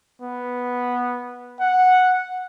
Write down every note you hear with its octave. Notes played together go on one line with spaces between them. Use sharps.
B3
F#5